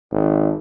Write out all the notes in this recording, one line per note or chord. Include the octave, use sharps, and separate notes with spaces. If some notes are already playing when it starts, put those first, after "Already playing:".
G#1